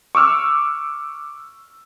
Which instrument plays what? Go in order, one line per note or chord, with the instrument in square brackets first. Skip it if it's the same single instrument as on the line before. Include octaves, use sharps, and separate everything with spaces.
[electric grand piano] C#6 D6 E6 F6